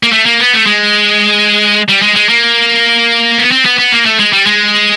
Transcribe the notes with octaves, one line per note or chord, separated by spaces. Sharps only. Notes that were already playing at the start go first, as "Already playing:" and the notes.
A#3
A3
A#3
B3
A3
G#3
G3
G#3
G#3
A#3
B3
C4
B3
B3
A#3
A3
G#3
G3
G#3